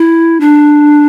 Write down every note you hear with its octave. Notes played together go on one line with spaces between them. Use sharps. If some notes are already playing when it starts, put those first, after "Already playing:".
Already playing: E4
D4